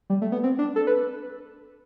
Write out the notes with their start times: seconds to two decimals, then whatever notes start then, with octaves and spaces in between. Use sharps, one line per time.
0.10 G3
0.22 A3
0.32 B3
0.43 C4
0.59 D4
0.76 A4
0.87 B4